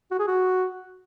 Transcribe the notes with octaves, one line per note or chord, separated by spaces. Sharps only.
F#4
G#4
F#4